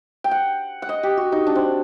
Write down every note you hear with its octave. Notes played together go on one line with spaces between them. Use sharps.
G5
F#5
F#5
D#5
G4
F#4
D#4
D4
C4